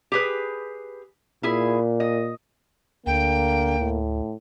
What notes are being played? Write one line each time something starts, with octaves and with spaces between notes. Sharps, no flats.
G4 G#4 B4
A#2 E4 G#4
D#5
D2 D3 A#3 G5
A2